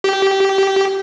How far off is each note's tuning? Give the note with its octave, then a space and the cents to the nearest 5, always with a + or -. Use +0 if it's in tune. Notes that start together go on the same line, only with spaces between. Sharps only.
G4 -15